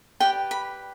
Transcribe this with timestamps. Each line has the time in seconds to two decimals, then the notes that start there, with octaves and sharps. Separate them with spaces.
0.20 G4 B4 D5 G5
0.51 B5